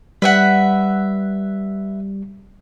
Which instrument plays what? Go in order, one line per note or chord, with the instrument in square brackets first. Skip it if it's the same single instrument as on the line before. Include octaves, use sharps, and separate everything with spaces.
[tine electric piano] G3 [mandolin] B4 E5 F#5